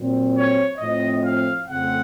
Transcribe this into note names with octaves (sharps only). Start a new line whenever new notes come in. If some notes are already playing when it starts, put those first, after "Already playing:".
Already playing: A#2 F#3 C4
C#5
A2 F3 C4 D#5
F5
F2 C#3 A3 C4 F#5